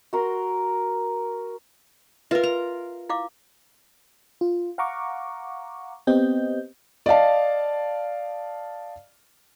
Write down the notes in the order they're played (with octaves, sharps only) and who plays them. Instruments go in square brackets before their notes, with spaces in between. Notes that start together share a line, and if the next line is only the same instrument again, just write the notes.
[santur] F#4 A#4 C6
[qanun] F4 A#4 [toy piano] B4 E5
[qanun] A#5
[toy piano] E4 F5 D6
[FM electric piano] F4
F5 F#5 A#5 C#6 D6
B3 C4 G4 D#5 G6
[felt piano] D5 D#5 F5 A5